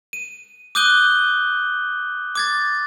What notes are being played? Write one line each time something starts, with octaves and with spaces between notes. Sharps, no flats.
D#7
D6 D#6 F#6 G6 D#7 G7
D6 G#6 A6